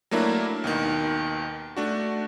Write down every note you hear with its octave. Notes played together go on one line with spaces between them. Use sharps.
F#3 A3 A#3 D4 E4 A#4
D#2 B2 D#3
A3 D4 F#4